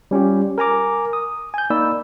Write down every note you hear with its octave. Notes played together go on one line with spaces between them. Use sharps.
G3 C#4 F4 G4
A#4 G#5 A#5 D6
D#6
G#5 G6
A#3 D#4 D5 B5 E6